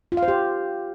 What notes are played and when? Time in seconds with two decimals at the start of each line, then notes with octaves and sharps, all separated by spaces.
0.12 F4
0.17 F5
0.23 C5
0.28 G4